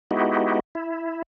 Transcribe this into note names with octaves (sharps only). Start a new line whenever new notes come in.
G#3 B3 D#4 E4 F#4 G4
E4